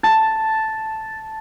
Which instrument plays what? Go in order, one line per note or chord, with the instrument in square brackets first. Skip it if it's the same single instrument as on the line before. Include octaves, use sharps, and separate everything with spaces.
[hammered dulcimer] A5